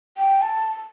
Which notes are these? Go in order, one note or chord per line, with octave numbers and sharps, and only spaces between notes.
G5
A5